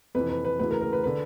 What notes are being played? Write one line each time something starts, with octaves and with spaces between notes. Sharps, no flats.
F2 C3 E3 B4
B4
B4
D2 C#3 E3 B4
A#4
A#4
B4
D3 B4